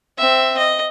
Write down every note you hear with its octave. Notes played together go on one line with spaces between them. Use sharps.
C4 E5
D#5